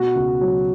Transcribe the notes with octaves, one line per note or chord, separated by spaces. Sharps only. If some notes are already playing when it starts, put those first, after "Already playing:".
Already playing: B2 F#4
C#2
F#3